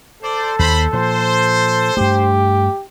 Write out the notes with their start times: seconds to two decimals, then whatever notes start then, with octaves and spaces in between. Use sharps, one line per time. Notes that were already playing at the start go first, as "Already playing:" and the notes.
0.23 A4 C5 D5
0.59 D#2 C5 B5
0.93 A#2 F3 C5
1.97 G2 A3 G4